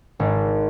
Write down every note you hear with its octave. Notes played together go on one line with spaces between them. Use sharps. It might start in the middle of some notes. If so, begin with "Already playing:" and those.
G#1